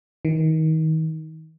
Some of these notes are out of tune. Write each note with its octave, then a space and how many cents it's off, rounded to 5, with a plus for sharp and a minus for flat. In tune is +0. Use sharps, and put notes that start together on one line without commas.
D#3 +30